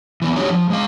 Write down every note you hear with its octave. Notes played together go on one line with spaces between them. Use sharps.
E3 B3
D3 D#4 F#4 G4 C#5
F3
G#3 F5